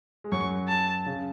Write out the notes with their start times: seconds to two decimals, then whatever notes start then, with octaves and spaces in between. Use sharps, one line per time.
0.24 G#3
0.32 F#2 F#3 C#6
0.69 A5
1.06 C#3